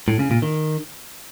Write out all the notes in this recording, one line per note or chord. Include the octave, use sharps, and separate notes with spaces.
A2
C#3
A#2
D#3